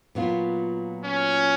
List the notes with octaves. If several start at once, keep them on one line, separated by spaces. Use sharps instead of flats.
A#2 F#3 B3 F4
C#4